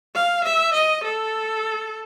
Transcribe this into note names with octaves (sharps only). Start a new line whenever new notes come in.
F5
E5
D#5
A4